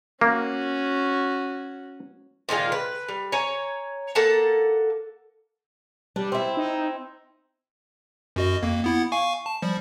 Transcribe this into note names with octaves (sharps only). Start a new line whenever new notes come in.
A#3 C#4 F#4
A#2 D#3 G#3 F4
B4
G3
C#5 G#5 A#5
A#3 A4 F#5 A5
G3 D4
C4 E4
D#4
F#2 F#4 D#5
F2 A#3
B3 E4 F#5
F5 G#5 C#6
A5
F3 G3